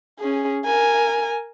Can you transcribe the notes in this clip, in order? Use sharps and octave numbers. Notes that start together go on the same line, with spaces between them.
C#4 G#4
A#4 G#5